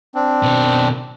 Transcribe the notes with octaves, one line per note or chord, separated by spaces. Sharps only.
C4 D4
B2 D#3